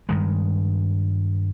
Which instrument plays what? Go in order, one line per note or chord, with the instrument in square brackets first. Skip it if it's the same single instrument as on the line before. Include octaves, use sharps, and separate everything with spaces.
[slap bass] G2 D#3 G#3